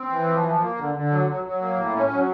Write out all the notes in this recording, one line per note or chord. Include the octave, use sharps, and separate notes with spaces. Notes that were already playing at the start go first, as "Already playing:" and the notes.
Already playing: C4
E3
F3
F3
A#3
D3
D3
F#3
F#3
F#3
A#3
A2
C#4
F#3